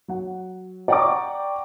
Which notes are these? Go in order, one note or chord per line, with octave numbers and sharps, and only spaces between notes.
F#3 F#5
D5 F#5 G5 A#5 C#6 D6